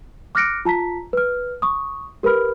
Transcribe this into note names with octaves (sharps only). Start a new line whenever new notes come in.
D6 F6 F#6 A#6 C#7 D7
F4 A5 A#5 B6
B4 F6
C#6 D#6
G4 A#4 B4 B5 F6